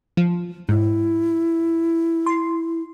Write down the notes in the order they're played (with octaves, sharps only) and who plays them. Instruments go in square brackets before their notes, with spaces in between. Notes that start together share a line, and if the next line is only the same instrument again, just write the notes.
[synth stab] F3
[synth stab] G#2 [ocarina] E4
[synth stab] C6